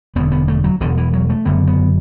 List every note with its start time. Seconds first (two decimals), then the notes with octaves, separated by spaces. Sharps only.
0.15 E1 E2 D3 B3
0.32 B3
0.48 A3
0.64 F#3
0.80 E1 E2 B2 D3
0.97 E3
1.13 F#3
1.30 A3
1.45 F#1 F#2 D3 B3
1.67 B3